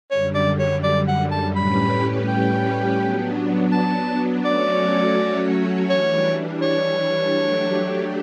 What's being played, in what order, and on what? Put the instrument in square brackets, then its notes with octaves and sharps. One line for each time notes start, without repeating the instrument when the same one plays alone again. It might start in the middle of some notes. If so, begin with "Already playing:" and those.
[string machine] F#2 D3 G3 [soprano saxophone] C#5
[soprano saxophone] D5
C#5
D5
F#5
A5
[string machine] A2 G3 C#4 G4 B4 [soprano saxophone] B5
[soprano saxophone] G5
[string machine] F#3 B3 D4
[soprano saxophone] A5
[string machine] F#3 A3 C#4 F#4 C#5 [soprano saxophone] D5
[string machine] E3 G3 D4 [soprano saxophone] C#5
[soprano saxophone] C#5
[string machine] F#3 A3 D4 G4